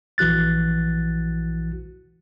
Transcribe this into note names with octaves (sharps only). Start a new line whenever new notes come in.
A#1 E3 F#4 F#6 A6